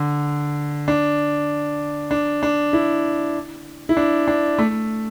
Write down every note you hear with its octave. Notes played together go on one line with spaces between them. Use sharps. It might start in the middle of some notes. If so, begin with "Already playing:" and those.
Already playing: D3
D4
D4
D4
E4
E4
D4
D4
A3